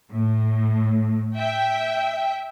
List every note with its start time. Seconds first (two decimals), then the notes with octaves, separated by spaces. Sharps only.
0.11 A2
1.36 E5 G5